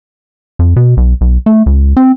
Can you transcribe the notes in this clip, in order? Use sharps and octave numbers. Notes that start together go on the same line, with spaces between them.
F2
B2
B1
B1
A3
C#2
C4